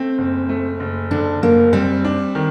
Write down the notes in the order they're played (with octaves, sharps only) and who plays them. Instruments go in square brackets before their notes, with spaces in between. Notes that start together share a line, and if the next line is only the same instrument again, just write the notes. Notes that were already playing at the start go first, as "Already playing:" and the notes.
Already playing: [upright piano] A3 [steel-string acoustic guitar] C4
[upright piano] F#1
A3
F#1
[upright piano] D3 [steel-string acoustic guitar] D4
[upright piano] F#1 [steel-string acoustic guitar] A#3
[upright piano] G3 [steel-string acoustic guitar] C4
[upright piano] D4
D#3